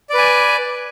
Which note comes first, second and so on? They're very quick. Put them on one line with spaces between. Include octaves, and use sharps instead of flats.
D5 B4 G#5